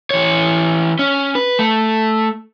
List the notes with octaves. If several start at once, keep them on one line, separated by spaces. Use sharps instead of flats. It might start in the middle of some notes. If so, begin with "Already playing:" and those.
E3 C#5
C#4
B4
A3